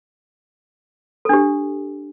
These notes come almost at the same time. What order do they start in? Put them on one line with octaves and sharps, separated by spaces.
A4 D4 G4